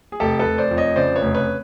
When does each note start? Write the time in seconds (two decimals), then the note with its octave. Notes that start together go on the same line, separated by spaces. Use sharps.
0.12 G#4
0.20 F1 G4 A4
0.39 A4 B4
0.46 F1
0.58 C5 D5
0.71 F2
0.77 C#5 D#5
0.96 C#3 C5 D5
1.16 B4 C#5
1.22 F1
1.34 B4 C#5